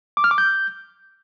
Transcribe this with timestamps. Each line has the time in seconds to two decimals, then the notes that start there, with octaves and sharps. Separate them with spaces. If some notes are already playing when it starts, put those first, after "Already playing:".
0.17 D6
0.24 F6
0.31 D6
0.38 G6